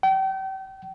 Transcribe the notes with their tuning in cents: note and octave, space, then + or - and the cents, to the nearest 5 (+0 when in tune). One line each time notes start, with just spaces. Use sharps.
G5 -35